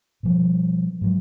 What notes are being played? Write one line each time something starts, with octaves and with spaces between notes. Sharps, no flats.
B2 F3 G3
G#2 F#3